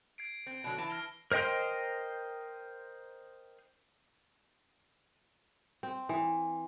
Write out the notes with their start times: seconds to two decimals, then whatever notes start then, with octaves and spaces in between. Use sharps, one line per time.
0.18 G#6 C7 D7
0.46 C4
0.64 B2 D3 F#3
0.78 E3 A5
0.90 F6 A#6 G7
1.32 A#4 C5 D#5 G5 C6
5.83 C4
6.09 E3